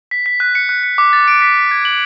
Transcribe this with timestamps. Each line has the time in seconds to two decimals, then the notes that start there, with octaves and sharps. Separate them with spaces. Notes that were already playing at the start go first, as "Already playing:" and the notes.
0.11 B6
0.26 B6
0.40 F#6
0.55 C#7
0.69 F#6
0.83 C#7
0.98 D6
1.13 A6
1.28 D7
1.42 B6
1.57 B6
1.71 G#6
1.85 F#7